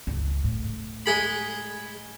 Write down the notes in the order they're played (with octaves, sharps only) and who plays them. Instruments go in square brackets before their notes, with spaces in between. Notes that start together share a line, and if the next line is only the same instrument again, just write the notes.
[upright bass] C#2 G2
A2
[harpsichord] G#3 G#4 B5